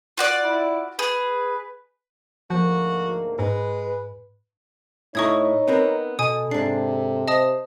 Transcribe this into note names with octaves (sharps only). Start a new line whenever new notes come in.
F4 F#4 D5
E4
G#4 B4
D2 G#2 F3 A#3 F#4
G#2 G#3 B4
A2 D#4 E4 C#5 A#5 C#6 D#6 G#6
B3 C4 A#4
B2 A4 G#5 D#6
G#2 C3 D4 C7
C5 D#5 A5 D#6